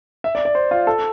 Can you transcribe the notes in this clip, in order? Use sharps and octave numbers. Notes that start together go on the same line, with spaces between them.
E5
D5
D5
C5
F4
A4